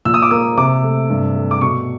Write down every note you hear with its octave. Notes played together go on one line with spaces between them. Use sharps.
A#2 E6
D#6
D6
A#3 D#6
C3 D6
A3
G2
A3
D6
B2 C#6